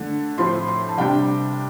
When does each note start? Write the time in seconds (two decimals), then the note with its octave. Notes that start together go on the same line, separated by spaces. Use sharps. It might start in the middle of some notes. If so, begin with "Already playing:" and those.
Already playing: D3 A3 D4
0.38 A2 F3 C4 C6
0.68 C6
0.89 A5
0.98 C3 G3 D4 G5